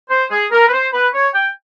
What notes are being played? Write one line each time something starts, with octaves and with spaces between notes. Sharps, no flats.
C5
G#4
A#4
B4
C5
B4
C#5
G5